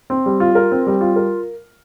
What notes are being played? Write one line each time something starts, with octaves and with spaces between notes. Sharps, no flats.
C4
G3
F4
A#4
C4
G3
F4
A#4